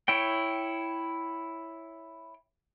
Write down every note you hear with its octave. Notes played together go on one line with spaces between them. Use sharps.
E4 C#5 G5